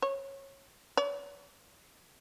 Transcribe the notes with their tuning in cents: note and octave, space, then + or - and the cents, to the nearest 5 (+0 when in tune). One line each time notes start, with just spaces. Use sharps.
C#5 -20
C#5 +45